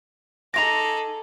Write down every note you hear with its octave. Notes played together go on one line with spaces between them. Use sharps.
D#4 F4 G#4 A4 D6 A#6 F7